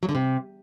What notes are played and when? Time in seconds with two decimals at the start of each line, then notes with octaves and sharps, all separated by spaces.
0.03 F#3
0.09 D3
0.15 C3